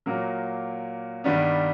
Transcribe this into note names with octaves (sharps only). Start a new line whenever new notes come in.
A#2 F#3 A#3
G2 D#3 G3 B3 D4